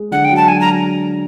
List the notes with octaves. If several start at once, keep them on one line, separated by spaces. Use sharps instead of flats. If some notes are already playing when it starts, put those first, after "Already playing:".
Already playing: G#3
D3 F#5
G5
F#3
A5
F#3 G#5
A#5